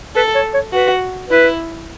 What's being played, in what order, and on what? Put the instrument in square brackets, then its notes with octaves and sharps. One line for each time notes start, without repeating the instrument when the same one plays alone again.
[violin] A4 [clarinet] B4
[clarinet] C#5
C#5
[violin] F#4 [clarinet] B4
[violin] E4 [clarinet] B4